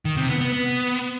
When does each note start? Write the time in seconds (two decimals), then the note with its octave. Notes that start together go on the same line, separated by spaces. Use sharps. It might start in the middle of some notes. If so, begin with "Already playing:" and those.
0.05 D#3
0.17 C3
0.29 B3
0.41 B3
0.52 B3